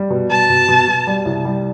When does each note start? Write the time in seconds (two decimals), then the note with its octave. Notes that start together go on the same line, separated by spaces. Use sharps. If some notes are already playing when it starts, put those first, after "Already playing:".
Already playing: G3
0.10 B2
0.30 B2 A5
0.50 B2
0.68 B2
0.88 B2
1.07 G3
1.25 C2
1.45 G3